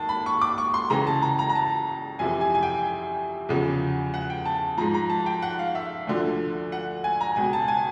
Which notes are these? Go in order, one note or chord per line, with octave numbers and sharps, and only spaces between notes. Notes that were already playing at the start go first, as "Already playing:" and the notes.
Already playing: D#2 D#3 A5
B5
C#6
D6
C#6
C6
C#2 C#3 E3 A#5
A5
A#5
A#5
A#5
A5
F2 C3 E3 G#5
G#5
G#5
G5
E2 C#3 F3
F#5
G5
A5
G#2 F3 A#5
A#5
A5
G5
F#5
F5
E5
D2 D3 F3
F#5
G#5
A#5
C#2 B2 G#5
A5
G#5